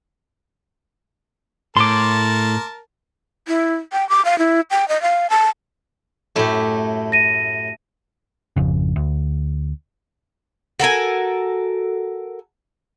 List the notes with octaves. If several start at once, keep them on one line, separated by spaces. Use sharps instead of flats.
A2 A#4 A5 C6 D6
E4
G5
D6
F5
E4
G5
D#5
F5
A5
F#2 A2 A3 E4 G4
A#6 D#7
G#1 F2 C#3
D2
F#4 A4 A#4 G#5